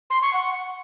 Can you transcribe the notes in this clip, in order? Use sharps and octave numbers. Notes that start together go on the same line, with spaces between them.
C6
C#6
F#5